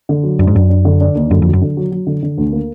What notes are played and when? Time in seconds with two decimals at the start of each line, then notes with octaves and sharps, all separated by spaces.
0.09 D3
0.23 F#3
0.39 F#2 D4
0.47 G#2
0.55 F#2 D4
0.69 D4
0.85 D3
1.01 D4
1.15 D#2
1.31 F#2 D3
1.42 F2
1.46 F#3
1.53 F#2
1.62 D3
1.77 F#3
1.92 F#3
2.07 D3
2.23 D3
2.38 D2
2.52 A#3